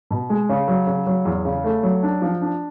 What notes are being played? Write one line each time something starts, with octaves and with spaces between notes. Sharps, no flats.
B2
G#3
C#3
F#3
C#3
F#3
E2
C#3
A3
F#3
D4
F3
D4